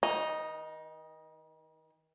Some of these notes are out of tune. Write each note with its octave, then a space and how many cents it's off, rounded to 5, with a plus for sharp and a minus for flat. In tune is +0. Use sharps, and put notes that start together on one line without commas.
D#3 +40 D#4 +0